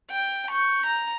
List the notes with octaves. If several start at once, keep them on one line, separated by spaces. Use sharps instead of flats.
G5
C#6 G6
A#5